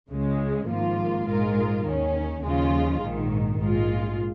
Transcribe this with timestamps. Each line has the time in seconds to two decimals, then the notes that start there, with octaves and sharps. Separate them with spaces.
0.09 C#2 C#3 G#3
0.67 G#1 G#2 F3 A#3 F4
1.26 A#1 G#2 G#3 F4 A#4
1.84 D#2 D#3 C#4
2.42 D#2 C#3 F3 G#3 F4
3.01 A#1 G#2 D#3
3.60 A#1 G#2 G#3 F4